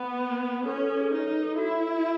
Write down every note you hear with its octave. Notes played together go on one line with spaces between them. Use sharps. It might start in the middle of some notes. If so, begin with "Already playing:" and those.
Already playing: B3
C#4 A4
B4
A4
G#4
D#4 B4
C#5
B4
A4
E4 F#4